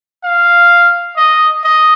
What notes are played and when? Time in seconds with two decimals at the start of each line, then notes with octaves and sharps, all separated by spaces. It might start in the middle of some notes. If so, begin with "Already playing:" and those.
0.24 F5
1.17 D#5
1.64 D#5